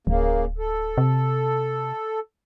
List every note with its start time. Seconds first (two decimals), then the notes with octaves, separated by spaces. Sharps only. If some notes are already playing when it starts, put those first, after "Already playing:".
0.07 D1 C#3 A#3
0.58 A4
0.98 C3